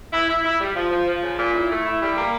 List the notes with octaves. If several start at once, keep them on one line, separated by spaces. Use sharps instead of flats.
E4
E4
E4
G3
F3
F3
F3
C#3
A#2
E4
A3
E4
G3
A#3